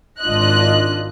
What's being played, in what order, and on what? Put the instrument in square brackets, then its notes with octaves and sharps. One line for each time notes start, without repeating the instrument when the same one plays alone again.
[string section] G#1 D4 F4 D#5 F#6